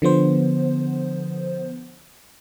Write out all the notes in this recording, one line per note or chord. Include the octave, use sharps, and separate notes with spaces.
D3 F3 B3 C5